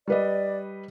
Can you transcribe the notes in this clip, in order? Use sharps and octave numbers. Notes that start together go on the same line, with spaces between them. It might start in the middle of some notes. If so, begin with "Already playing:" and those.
G3 B4 D5 D#5